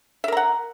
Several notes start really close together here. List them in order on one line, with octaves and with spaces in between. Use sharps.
E5 A#4 A#5 F#5